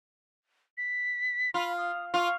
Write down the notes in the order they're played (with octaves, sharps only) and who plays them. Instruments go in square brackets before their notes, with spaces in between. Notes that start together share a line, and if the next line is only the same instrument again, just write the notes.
[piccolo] B6
[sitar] F4 [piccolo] B5
[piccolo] D#6
[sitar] F4 [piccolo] C#6